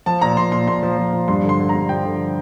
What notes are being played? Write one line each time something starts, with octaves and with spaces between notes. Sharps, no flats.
F3 A5
A#2 A#5
A#2 C6
A#2 C6
A#2 C6
F3
F3
F3
G2 C6
D3
C6
D3
A#5
G2
F3 G5
D3